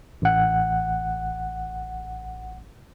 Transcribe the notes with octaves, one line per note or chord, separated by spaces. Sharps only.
A1 F#5